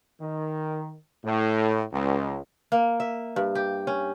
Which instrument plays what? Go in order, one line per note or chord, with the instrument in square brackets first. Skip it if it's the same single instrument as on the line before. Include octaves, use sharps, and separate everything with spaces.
[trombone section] D#3
A2
C#2
[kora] A#3
E5
G2
G4
C#4